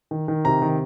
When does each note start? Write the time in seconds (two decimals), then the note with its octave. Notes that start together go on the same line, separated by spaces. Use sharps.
0.11 D#3
0.28 D#3
0.44 C3 A#5
0.62 D#3